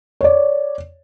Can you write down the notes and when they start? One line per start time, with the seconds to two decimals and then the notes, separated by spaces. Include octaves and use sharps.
0.21 C#5 D5